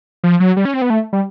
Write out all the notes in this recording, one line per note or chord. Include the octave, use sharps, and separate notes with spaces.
F3
F#3
G3
C#4
C4
B3
A3
G3